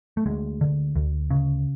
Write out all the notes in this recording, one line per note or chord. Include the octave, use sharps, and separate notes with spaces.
A3
D2 G#3
D3
D2
C#3